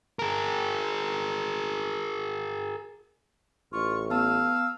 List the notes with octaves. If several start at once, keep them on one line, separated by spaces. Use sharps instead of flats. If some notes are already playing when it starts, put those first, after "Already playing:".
G#4 A#4
A1 F4 C#6
B3 F5 A5 E6